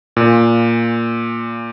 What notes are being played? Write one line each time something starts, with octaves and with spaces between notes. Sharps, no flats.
A#2